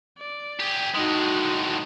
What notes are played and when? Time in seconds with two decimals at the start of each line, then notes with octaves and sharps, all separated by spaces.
0.18 D5
0.60 G4 G#4
0.95 A2 G#3 D#4 F#4